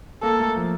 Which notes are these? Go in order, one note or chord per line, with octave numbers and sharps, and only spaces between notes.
A#3 A4
A3
F3